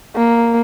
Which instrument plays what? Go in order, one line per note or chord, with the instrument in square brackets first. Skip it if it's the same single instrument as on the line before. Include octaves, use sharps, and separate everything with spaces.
[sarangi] A#3